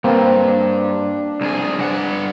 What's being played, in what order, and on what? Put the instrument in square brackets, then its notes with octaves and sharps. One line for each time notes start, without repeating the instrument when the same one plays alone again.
[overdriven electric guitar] G2 [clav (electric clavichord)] A#3 C4 C5
[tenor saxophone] D4
[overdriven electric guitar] C2 G#4
[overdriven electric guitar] G2 F#5 [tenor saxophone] D4